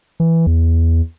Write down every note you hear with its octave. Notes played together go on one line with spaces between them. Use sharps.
E3
E2